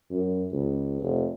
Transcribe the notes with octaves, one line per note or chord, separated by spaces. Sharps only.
F#2
C#2
F1